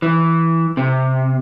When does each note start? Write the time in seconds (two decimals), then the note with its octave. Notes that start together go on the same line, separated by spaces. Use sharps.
0.02 E3
0.77 C3